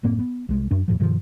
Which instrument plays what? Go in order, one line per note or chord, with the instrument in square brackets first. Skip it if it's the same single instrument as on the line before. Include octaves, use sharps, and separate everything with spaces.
[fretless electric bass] F#1 A2 A#3 C4
B3
C2 G#3
F#2 D4
F2 A2 F3
G2 B2 D#3 F3